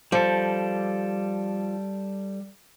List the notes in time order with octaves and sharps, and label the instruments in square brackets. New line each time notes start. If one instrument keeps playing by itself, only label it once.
[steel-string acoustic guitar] F3 [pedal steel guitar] G3 A4